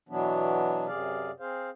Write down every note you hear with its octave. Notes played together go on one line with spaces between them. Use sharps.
B2 E3 F#3 B3 D4
F#2 C3 G#4 D5 F5
C4 G#4 C5 F5